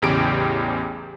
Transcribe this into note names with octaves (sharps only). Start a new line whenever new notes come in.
A1 E2 C#3 G4 D7